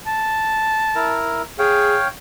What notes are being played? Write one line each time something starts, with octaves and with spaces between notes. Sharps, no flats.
A5
E4 A#4
G#4 C#5 F5 G5